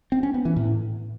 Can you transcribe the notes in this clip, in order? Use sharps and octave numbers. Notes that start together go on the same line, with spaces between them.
C4
C#4
B3
E3
A2